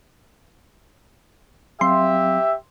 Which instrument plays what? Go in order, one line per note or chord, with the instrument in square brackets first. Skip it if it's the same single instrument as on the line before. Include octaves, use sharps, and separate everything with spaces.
[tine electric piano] F#3 C4 F5 [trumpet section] G4 E5 [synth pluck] C6